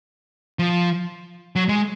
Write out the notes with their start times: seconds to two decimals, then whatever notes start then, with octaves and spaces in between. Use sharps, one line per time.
0.59 F3
1.56 F#3
1.69 G#3